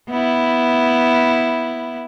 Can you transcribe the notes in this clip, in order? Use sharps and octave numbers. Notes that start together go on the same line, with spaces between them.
B3 E4